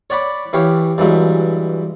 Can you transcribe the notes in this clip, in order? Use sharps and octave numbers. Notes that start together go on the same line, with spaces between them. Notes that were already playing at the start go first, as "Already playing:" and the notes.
C#5 D5 F#5 B5 D6
E3 G4 C#5 F5
G2 E3 F#3 G#3